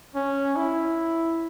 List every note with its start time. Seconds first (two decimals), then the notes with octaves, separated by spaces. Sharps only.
0.16 C#4
0.56 E4